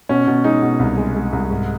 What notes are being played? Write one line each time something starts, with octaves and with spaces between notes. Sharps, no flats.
B2 C#4
B2
G#3 D#4
B2
C2
G#3
G#3
C2
G#2